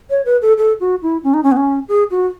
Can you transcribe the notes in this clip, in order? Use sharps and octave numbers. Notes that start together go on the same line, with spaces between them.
C#5
B4
A4
A4
F#4
E4
C#4
D#4
C#4
B3
C#4
G#4
F#4